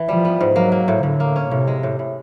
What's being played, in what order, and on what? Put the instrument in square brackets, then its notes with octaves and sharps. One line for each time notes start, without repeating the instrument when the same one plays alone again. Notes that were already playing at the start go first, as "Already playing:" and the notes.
Already playing: [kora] E3
[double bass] F3 [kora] G3
[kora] B3
G#2
[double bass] F#3 [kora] A#3
[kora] A#3
A2
[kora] A2 [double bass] D3
[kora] A#3
C#4
[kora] A2 [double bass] C3
[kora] G#3
A2
A2